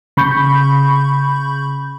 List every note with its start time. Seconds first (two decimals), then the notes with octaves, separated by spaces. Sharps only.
0.17 C#3 B5 C#6 G6